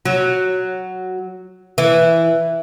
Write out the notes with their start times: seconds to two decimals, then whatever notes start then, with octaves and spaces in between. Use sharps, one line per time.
0.05 F#3
1.78 E3